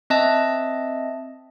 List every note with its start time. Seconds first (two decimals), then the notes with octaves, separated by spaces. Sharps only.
0.10 C4 D#5 E5 A5